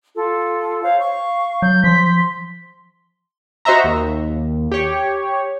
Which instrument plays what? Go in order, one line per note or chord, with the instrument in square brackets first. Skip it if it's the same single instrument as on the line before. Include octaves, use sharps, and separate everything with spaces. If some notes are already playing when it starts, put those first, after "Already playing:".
[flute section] F4 A4
C5 C#5 F5
F5 C#6
[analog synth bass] F#3 [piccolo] G6
[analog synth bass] F3 [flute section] C6 [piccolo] B6
[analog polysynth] F#4 C5 D#5 E5 A#5
D#2
G4 C#5